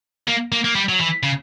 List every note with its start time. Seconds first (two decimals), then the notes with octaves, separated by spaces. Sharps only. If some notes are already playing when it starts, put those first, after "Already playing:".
0.28 A#3
0.52 A#3
0.65 A#3
0.75 G3
0.89 F#3
1.00 E3
1.23 C#3